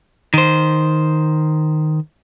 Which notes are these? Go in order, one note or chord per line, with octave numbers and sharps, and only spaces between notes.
D#3 C5